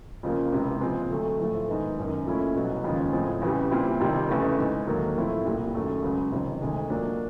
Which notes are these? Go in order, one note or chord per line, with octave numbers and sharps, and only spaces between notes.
F2 C#3 F3 A#3
C#2 C3 E3
A#2 F3 G#3 C4
D2 D3 F#3 A3
A#1 A2 F3 A3
G#2 D#3 G#3 B3
F#1 F#2 D#3
A#2 F3 A3 C#4 E4
C2 B2 F#3
D#2 C#3 F3 G#3
A2 F3 G#3 C4
E2 C#3 E3 G3
A#2 G3 C4 E4
F2 C3 D#3 G3 C4
F1 E2 C#3 E3 A3
G#2 E3 G#3
D#2 D3 F#3 A#3
A2 F3 A3 C4 E4
C2 A#2 G3 A#3
F#2 D#3 F#3 A3
C#2 C#3 F#3
F2 C3 D#3
D2 C3 D#3 G#3
A#2 F#3 A#3 D4